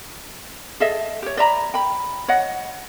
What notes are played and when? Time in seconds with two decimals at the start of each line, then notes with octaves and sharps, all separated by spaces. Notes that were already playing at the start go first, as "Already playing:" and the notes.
0.80 G#4 A4 D#5 E5
1.22 G4 C#5
1.37 D5 E5 A#5 B5
1.74 G5 B5
2.28 C#5 D#5 F#5